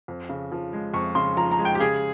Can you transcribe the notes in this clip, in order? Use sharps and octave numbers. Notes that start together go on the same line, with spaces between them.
F2
C#3
F3
G#3
F2 C#6
C#3 C6
F3 A#5
A#5
G#3
G5
G4
C#3 G#4